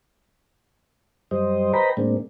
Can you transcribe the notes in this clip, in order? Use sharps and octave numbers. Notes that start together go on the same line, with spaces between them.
F#2 G3 G4 C5 D#5
B4 C5 D#5 G5 A#5 B5
A2 G#3 A#3 C4 D4